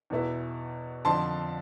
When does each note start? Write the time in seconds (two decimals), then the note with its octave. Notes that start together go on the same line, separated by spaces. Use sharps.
0.10 E2 B2 B3 E4
1.05 F2 D3 F3 A5 C6